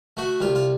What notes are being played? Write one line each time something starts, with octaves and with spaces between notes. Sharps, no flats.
A3 F#4
C2 F4
F4